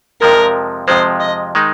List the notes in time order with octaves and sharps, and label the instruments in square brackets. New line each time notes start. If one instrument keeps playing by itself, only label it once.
[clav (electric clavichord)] F2 C3 F3 G#3 [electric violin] A#4
[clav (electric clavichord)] F2 C3 F3 G#3 [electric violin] C5
[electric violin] D#5
[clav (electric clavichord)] D#3 G#3 D#4